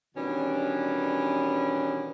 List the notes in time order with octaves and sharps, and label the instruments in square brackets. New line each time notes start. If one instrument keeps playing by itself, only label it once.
[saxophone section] B2 D#3 E3 G3 C#4 D4